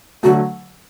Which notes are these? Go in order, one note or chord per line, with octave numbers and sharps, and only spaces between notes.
D3 F#3 A3 F#4